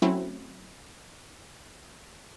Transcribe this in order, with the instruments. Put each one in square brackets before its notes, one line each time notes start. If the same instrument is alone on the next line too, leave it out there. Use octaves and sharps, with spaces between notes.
[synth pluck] F#3 A3 C4 C#4 E4